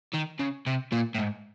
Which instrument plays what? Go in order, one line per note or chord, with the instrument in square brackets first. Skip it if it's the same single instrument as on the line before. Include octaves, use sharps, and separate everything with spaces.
[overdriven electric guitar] D#3
C#3
C3
A#2
A2
G#2